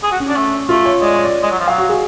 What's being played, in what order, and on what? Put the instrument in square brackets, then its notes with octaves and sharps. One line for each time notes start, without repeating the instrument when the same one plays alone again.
[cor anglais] G#4
F#4
[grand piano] C#4
[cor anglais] D4
A3
[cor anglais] A3 [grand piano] F4
[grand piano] C#5
[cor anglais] G#3 [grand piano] D5
[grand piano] C#5
D5
[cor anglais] G#3
F#3
F3
[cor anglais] F#3 [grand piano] F5
[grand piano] F#4
G#4